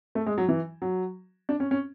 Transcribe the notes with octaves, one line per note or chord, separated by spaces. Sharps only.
A3
G#3
F#3
E3
F#3
D4
C#4
C#4